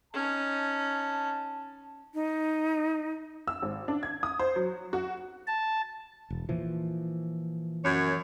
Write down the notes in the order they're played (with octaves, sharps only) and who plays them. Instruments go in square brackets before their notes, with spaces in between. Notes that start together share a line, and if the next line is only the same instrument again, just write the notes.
[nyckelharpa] C#4 D#4 [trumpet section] A5
[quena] D#4
[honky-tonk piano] E6
G#1
D4
G#6
D#6
C5
F#3
F#4
[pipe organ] A5
[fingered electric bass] E1
A#2 E3 F3
[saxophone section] F#2 C#5